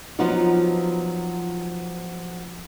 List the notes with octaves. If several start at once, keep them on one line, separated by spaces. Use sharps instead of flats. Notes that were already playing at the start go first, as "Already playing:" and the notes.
F3 F#3 B3 D#4 F4 F#4